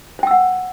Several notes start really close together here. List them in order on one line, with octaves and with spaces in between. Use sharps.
C5 G5 E6 F#5